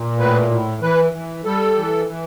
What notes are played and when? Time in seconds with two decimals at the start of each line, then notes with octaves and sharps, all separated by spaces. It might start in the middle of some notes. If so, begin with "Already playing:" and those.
Already playing: A#2
0.19 A2 B4
0.51 A2
0.82 E3 B4
1.13 E3
1.45 G3 A4
1.77 E3
2.07 E3